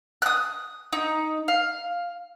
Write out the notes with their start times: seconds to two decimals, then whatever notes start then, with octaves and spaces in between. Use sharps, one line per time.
0.22 D#6 F#6
0.93 D#4
1.48 F5